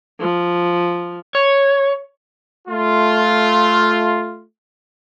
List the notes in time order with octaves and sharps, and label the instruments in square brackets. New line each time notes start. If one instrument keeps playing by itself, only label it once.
[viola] F3
[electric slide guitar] C#5
[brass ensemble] A3 F4